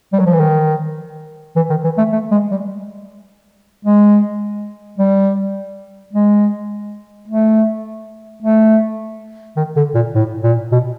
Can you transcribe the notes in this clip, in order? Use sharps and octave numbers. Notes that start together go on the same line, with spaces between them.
G3
F#3
F3
E3
D#3
E3
D#3
E3
A3
A3
G#3
G3
G#3
G3
G#3
A3
A3
D#3
D3
A#2
A2
A#2
B2